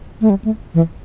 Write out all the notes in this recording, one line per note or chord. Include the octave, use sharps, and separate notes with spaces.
A3
G3
A3
E3